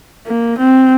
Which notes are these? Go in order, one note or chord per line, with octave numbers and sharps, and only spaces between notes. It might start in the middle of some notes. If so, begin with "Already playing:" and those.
A#3
C4